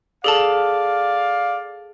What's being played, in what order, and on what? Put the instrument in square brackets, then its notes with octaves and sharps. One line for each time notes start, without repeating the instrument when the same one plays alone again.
[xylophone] G#4 A4 A5 [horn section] D5 F5